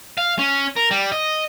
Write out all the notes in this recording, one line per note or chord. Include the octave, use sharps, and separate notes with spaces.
F5
C#4
A#4
G3
D#5